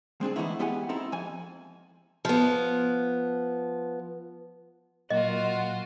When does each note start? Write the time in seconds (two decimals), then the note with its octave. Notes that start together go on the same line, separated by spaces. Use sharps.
0.21 G#3 C4 D4 G#4
0.36 E3 G#3 A3 B3 D#4 E4
0.59 G#3 B3 E4 G4 F#5 G#5
0.89 C4 D#4 E4 A4
1.12 F2 F3 G#5
2.25 F3 B3
5.10 A#2 F#3 A#3 F4 F#4 D#5